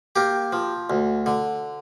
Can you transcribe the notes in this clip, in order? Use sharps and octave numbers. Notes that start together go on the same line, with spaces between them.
A#3 G4
F3
D2
D3